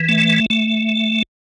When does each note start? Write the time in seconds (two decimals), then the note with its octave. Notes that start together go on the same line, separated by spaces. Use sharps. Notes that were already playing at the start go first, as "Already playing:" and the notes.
Already playing: E3
0.09 A3
0.50 A3